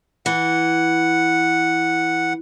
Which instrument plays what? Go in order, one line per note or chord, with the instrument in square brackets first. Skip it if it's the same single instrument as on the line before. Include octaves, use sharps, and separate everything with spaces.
[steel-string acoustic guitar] E3 [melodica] F#5